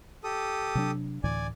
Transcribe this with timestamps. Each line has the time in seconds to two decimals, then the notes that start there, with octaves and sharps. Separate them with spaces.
0.24 G4 A4 D#6
0.75 C3 F#3 D4
1.24 D2 A2 E3 D5 G#5